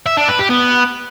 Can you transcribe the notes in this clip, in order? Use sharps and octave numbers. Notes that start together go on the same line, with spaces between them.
E5
D4
B4
G4
B3